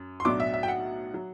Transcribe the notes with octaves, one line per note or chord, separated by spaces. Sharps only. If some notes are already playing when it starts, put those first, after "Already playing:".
Already playing: F#2
C6
B1 A2 F#3 B3 D4 D6
E5
E5
G5
F#5
F#3